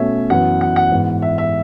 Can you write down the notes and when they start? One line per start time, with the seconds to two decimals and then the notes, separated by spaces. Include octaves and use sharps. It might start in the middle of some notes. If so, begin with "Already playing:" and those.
Already playing: B2 A3 C#4 E5
0.30 F#2 E3 B3 F#5
0.61 F#5
0.76 F#5
0.92 G#2 E3 B3
1.22 E5
1.38 E5